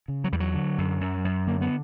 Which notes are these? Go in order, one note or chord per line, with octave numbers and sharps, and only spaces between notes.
C#3
F#3
E2 G3
F#3
D3
F#2
F#2
F#2
D3 A#3
B3